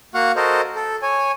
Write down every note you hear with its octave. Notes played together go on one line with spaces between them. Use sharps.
A#3 F#4 F5 F#5 C#6
F#4 A4 A#4 C5 D#5
A4
C#5 G#5